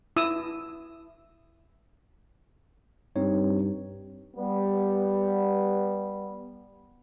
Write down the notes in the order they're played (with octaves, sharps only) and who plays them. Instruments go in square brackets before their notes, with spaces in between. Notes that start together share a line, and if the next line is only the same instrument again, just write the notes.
[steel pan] E4 D#6 E6
[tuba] G2 [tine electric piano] C4 D#4 C#5
[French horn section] G3 B3